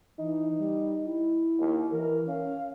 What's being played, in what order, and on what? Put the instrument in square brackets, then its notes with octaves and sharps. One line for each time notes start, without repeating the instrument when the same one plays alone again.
[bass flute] E3 [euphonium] D#4
[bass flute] G3
E4
[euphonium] D#2
[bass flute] E3 [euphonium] A#4
[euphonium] C#4 [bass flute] F5